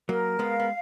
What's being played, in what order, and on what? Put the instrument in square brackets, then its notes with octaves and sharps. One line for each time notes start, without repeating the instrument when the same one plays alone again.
[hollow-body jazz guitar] F#3 A#3 [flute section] A#4
[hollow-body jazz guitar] G#3 B3 [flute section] F5
[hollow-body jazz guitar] B3